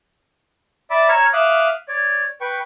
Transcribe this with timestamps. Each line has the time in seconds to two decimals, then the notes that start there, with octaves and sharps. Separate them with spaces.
0.90 D5 E5 B5 D6
1.09 C#5 A#5 C#6 E6 F6
1.33 E5 F5 D6 D#6 F6 F#6
1.88 C#5 D5
2.41 B4 G5 C#6